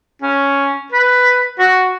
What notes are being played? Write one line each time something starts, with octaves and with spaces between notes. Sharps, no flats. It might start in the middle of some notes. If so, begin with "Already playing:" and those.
C#4
B4
F#4